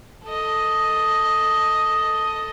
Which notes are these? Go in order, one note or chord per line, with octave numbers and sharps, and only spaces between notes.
A4 D#5